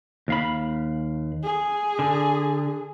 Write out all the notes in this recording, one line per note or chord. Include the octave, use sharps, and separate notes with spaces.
D#2 F5 B5
G#4
D3